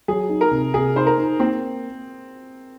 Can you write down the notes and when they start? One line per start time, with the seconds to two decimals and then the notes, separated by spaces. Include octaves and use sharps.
0.08 F#3 G#4
0.29 D#4
0.41 A#4
0.51 C3
0.74 C3 G#4
0.96 D#4 C5
1.07 A#4
1.18 D#4
1.39 A#3 C4